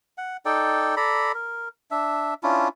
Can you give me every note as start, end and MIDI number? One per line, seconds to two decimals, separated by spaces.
0.18 0.37 78
0.45 0.95 63
0.45 0.95 69
0.45 0.95 74
0.45 0.95 79
0.97 1.32 69
0.97 1.32 74
0.97 1.32 82
0.97 1.32 83
1.35 1.69 70
1.91 2.34 62
1.91 2.34 76
2.43 2.69 61
2.43 2.69 62
2.43 2.69 64
2.43 2.69 65